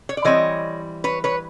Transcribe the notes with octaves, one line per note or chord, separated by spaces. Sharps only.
C#5
D5
E3 G3 C4 C#5 D#5
B4 C#5
B4 C#5